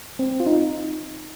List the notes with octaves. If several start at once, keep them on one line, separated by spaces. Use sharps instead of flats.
C4
F4
D#4